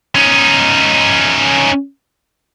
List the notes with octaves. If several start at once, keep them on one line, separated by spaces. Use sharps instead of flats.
C#4 D#4